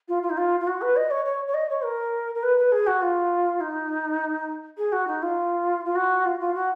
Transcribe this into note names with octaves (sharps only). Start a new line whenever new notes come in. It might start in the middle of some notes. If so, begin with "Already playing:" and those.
F4
F4
D#4
F4
F4
F#4
B4
D#5
C#5
C#5
C#5
D#5
C#5
A#4
A#4
B4
B4
G#4
F#4
F4
D#4
G#4
F#4
D#4
F4
F4
F#4
F4
F4
F#4